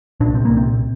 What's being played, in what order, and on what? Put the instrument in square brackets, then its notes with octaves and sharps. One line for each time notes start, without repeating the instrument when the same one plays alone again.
[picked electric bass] C2 A#2 D4
C4
C2 A#2 A#3
C4